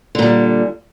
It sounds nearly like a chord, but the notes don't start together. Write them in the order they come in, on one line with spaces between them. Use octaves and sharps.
D3 A#2 G3